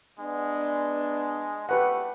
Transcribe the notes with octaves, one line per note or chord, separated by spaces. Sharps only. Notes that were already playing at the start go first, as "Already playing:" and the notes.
G#3 B3 D4
A3 G4 B4 F#5